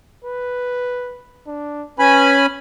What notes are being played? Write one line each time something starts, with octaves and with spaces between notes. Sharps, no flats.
B4
D4
C#4 B4 G#5 B5